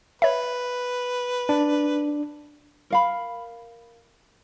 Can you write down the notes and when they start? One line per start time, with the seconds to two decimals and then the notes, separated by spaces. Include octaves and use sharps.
0.22 B4 C#5 E5
1.49 D4
2.90 A#4 F5 B5